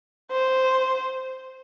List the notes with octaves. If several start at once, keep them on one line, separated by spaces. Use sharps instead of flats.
C5